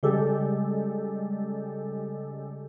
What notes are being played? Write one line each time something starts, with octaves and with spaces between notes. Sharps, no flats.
C#3 G3 G#3 G4 A4